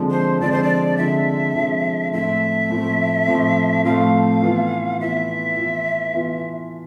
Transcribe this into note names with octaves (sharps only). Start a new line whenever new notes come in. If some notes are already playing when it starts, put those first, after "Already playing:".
Already playing: D3 F3 G#3 C4
C5
D3 F3 G#3 C4 D5
C5
D5
D3 F3 G#3 C4 E5
D3 F3 G#3 C4
A2 F3 A3 C4 E5
A2 F3 A3 C4
A2 F3 A3 C4
A2 F3 A3 C4 F5
E3 B3 F4
E3 B3 F4 E5
E3 B3 F4
E3 B3 F4